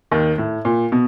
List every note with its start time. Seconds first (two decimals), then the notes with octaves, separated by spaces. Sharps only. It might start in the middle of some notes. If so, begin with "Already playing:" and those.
0.11 D#2 D#3
0.38 A2
0.65 A#2
0.92 B2